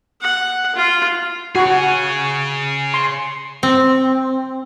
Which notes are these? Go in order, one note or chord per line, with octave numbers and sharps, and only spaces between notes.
F#5
F4
F#4 G#4 C#5
C6
C4